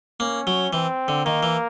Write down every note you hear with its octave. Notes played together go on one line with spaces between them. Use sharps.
A#3 C#4
F#3
E3 C4
D3
D#3 A#3
E3